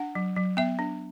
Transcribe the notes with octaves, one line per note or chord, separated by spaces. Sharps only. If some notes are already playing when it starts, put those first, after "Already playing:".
Already playing: D4 F#5
F#3
F#3
B3 E5
D4